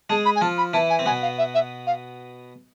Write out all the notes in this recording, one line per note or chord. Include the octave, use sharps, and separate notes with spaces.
G#3 G#4 A5
B5
G#5
F3 F4 A5
B5
E3 E4 A5
G#5
C4
B2 B3 G#5
F5
E5
E5
F5